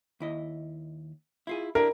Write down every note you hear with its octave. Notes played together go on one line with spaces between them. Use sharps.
D#2 E4 D#5
E4 F4 G#4
D4 E4 G4 A#4